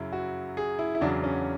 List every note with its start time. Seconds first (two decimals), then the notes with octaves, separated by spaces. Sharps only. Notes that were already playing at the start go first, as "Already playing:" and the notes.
Already playing: F#2 C#3 F#3 E4
0.13 F#4
0.57 G#4
0.79 E4
0.95 E4
1.01 E2 C#3 F#3 D4
1.24 C#4